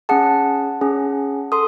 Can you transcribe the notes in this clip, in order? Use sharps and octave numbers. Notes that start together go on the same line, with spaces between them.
C#4 G#4 F#5 A5
C#4 G#4
A4 C6 D#6